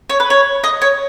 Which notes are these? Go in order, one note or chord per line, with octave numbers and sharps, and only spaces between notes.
C#5
B4
C#5
D#5
C#5